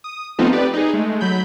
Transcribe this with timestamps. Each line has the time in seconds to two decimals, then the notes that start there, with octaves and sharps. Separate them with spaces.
0.04 D#6
0.39 F3 A3 B3 C4 D#4 F4
0.53 G4 B4 D5
0.73 D#4 G#4
0.94 G#3 A3
1.21 F#3 B5 G6